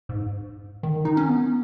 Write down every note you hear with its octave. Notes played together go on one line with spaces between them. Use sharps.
G#2
D#3
D#4
C#4
B3